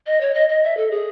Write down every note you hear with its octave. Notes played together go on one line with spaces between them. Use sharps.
D#5
C#5
D#5
D#5
E5
A4
G#4